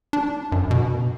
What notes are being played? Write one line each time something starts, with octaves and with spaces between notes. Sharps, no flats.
D4
F#2
B2